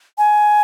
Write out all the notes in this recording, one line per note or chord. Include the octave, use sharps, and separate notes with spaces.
G#5